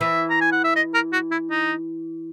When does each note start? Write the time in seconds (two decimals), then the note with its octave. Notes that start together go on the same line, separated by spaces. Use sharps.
0.01 E3 E5
0.30 A#5
0.41 G#5
0.52 F#5
0.64 E5
0.76 D#5
0.94 A#4
1.13 F#4
1.31 E4
1.50 D#4